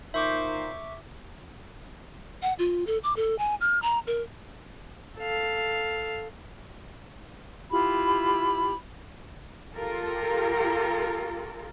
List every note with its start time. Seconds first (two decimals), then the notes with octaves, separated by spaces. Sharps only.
0.14 A#2 D#4 C5 E5 C#6 D6
2.42 F#5
2.59 F4
2.87 A4
3.04 D6
3.16 A4
3.39 G#5
3.61 F6
3.82 A#5
4.07 A#4
5.18 A4 F5
7.71 E4 F4 G4 B5
9.74 F4 G4 A4 A#4